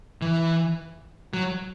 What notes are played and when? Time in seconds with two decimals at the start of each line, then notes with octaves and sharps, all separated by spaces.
0.22 E3
1.34 F#3